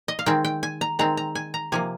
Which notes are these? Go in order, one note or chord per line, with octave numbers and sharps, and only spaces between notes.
D#5
F5
D#3 G#3 C4 G5
G5
G#5
A#5
D#3 G#3 C4 A#5
A#5
G#5
A#5
C3 F3 A#3 G#5